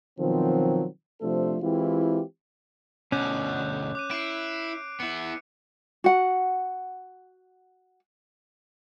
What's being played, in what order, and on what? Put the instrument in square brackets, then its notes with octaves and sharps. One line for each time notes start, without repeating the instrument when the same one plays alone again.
[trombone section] B2 D#3 F3 F#3 C4
C3 F3 A3 D4 A4 C5
E3 G#3 C4 E4 F4 G4
[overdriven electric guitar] D2 B2 [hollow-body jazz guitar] C#4 [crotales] D6 F#6 G6
[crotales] D6 F#6 D#7
[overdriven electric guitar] E4 [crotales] C7 D7
[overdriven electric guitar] B3 E4 [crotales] C#7
[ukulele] F#4 F#5